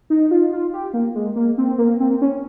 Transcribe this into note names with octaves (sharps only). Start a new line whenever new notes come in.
D#4
F4
F4
G4
A#3
G#3
A#3
C4
A#3
C4
C#4